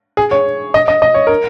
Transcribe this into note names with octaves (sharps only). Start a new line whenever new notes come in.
G#4
C#5
D#5
D#5
D#5
C#5
A#4